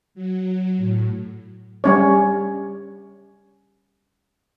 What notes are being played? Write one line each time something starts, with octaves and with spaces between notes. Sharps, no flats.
F#3
A2
G3 C#4 C#5